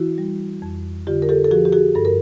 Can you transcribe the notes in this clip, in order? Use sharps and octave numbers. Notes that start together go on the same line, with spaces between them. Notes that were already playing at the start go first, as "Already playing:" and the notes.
Already playing: E3 E4 F#4
G3
F2
D3 F4 G4
A#4
G4 A4
A4
F3 F#4 G#4
G4
F#4 G#4
G2 A4
A#4